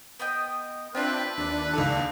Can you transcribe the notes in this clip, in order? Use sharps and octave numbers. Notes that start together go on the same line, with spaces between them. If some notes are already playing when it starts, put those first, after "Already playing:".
B3 D#5 G5
C4 D4 F4 B4 E5 G5
D#2 D4
C#2 D#4 A4